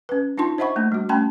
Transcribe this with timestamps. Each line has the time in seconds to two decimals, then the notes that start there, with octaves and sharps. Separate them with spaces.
0.09 C#4 B4
0.37 D4 D#4 F4 A5 C6
0.58 C5 D#5 E5 F#5 B5 C#6
0.76 A3 A#3 D4
0.92 G3 F#4
1.09 A3 C#4 G5 A5 B5 C6